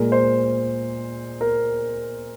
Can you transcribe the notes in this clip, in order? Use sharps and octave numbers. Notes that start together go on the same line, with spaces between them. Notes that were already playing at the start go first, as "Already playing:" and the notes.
Already playing: A#2 G#3 A#4
C5
A#4